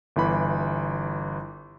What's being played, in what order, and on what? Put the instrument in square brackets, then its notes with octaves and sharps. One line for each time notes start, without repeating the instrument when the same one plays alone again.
[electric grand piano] G1 E3 B5